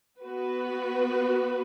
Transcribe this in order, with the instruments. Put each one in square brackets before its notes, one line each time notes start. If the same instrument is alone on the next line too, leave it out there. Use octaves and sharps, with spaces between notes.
[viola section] B3 F#4 B4